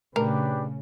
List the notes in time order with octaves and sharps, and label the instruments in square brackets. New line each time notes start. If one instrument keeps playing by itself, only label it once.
[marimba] A#2 A3 [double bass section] C#3 [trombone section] D4 G4 B4 [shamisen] A#4